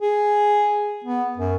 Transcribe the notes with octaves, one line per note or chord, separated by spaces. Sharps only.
G#4
B3
F#2